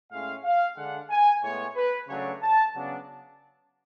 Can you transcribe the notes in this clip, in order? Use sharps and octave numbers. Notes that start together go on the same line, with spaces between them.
A2 G#3 C#4 F5
F5
D3 G#3 D4 F#5
G#5
A2 G#3 B3 C#5
B4
C#3 F#3 A3 D4 C#5
A5
C#3 F#3 B3 D4